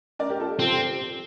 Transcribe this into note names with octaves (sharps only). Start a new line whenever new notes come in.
A#4 D5
G4 A#4
F4 A4
G4
C4 F4 A4
G4